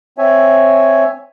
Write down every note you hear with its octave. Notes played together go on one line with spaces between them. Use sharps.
C4 C#5 E5 G#5